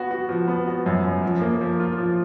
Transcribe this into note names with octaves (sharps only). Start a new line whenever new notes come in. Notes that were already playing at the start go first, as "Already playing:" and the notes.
Already playing: B3 F#4
F#4
F3
B3
F#4
F#2
F#2
F3
A#3
F3
F4
F3